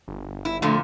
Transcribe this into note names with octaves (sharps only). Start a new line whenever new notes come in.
G1
E4
F2 A#2 D3 A3